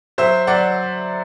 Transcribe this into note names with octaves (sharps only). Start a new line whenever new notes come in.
F#3 C5 E5
F#3 D5 F#5